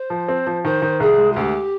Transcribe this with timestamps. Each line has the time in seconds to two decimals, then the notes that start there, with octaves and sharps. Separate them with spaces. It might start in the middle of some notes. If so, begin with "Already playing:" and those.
Already playing: C5
0.10 F3
0.28 C4
0.47 F3
0.64 D#3 C5
0.82 D#3
1.00 C2 G#4
1.18 G#3
1.32 F4
1.36 D2 G4